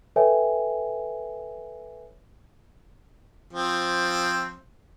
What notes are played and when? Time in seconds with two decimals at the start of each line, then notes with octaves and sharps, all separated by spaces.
0.16 A4 B4 C#5 E5 G5 G#5
3.53 F3 C4